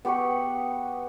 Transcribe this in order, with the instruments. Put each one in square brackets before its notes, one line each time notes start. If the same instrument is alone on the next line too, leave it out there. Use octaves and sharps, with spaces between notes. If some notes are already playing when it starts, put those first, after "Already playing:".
[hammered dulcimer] B3 G4 B4 C#6